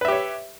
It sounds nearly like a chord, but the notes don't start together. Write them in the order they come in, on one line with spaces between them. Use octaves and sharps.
B4 E5 G4 C#5